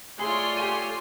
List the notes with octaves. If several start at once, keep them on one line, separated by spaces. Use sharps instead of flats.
A3 F4 G#4 C#5 D5 C6
G4 G#5 D#7